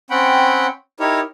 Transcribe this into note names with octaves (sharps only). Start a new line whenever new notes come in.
C4 C#4 F#5 G5 B5
D#4 E4 G4 A#4 C#5